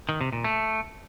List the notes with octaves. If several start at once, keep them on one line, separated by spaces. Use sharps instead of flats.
D#3
C3
A#2
A3